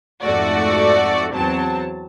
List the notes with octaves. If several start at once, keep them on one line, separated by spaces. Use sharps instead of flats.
F2 G#2 A3 F#4 D5
E2 F#3 C4 A5